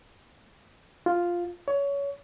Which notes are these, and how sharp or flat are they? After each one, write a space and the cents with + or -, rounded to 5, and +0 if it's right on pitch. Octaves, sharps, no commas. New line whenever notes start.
F4 +0
C#5 +20